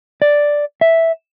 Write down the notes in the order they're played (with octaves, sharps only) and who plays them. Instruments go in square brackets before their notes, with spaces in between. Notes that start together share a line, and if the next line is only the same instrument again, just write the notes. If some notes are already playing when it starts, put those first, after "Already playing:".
[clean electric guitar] D5
E5